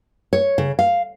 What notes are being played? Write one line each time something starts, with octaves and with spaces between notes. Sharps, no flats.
C#5
C#3
F5